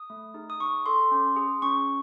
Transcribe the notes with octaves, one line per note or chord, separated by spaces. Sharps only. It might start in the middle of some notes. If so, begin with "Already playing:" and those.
Already playing: D#6
A3
D#4 G#4
D#6
D#4 C#6
A4 C6
C#4
G#4
C#4 C#6